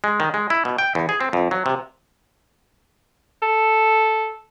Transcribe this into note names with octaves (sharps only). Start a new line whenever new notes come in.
G#3
D#3
G#3
E4
B2
G5
E2
G#4
C4
F2
F#3
C3
A4